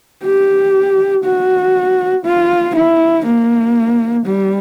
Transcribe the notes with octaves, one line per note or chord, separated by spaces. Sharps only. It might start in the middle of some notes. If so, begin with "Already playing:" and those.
G4
F#4
F4
E4
A#3
G3